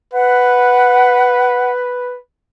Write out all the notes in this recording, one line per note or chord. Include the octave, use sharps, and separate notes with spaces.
B4 F#5